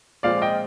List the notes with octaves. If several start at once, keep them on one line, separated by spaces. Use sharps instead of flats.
A#2 F3 G#3 C4 D5 F5
D#5 G5